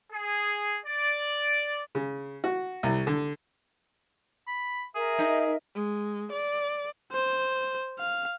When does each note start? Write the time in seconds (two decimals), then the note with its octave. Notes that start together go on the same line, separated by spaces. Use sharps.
0.13 G#4
0.86 D5
1.95 C#3
2.44 F#4
2.83 C2
3.07 D3
4.48 B5
4.95 G#4 A#4 E5
5.19 D#4
5.40 G#4
5.75 G#3
6.32 D5
7.12 C5
7.99 F5